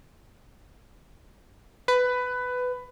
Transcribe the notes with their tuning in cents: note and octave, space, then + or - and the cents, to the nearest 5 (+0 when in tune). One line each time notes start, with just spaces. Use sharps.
B4 +15